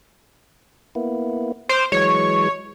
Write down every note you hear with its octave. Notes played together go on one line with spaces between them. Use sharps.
A#3 B3 E4
C5 C6 D6 F6
E3 F#3 G#3 C#5